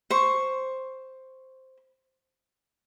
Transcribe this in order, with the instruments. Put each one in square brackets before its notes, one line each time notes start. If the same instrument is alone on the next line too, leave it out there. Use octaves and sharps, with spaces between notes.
[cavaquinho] C5 C#6